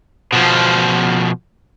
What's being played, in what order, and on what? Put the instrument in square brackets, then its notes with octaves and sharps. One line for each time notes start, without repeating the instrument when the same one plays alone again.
[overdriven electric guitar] B2 F3